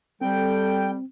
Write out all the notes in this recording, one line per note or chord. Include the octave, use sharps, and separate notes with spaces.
G3 C4 A4 G5